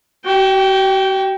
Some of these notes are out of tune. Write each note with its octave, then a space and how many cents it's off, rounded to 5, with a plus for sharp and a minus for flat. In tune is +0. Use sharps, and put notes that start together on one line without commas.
F#4 +45 G5 -5